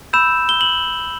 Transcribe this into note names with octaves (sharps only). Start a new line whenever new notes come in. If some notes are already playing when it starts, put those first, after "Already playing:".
B5 E6 G6 E7
G7
F#7